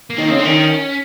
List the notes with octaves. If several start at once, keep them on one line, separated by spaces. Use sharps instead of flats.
A#3
D#3
C#3 C4
D3
D#3 C#4